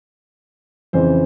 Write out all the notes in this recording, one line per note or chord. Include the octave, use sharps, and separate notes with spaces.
F2 C#3 E3 C5